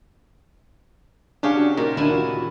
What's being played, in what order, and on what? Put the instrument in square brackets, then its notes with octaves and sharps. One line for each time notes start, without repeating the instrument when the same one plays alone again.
[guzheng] C#3 G4 C#5 [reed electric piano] D4 G#4 F5
[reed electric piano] D4 F#4
[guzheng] A#2 [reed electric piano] D#4 F#4
[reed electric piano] D2 D4 [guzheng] E4 G#5
[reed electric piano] D#3 F4 F#4